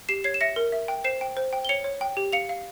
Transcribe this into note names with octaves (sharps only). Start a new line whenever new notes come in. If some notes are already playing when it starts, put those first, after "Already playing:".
G4 C7 E7
C#5 G#6 C7
E7
E5 A#6 C#7
A#4
E5
G5
C5 C7 E7
G5
C5
G5
G7
C#5 C#7 F7
C#5
G5
G4
F5 C#7 F7
F5